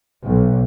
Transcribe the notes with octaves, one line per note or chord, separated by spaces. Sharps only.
B1